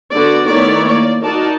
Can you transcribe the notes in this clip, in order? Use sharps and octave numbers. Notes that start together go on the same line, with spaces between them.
D3 B3 F#4 D5
D#3 A3 B3 E4 C#5 D5
A#3 D5
D#4 F#4 A#4 D5 A5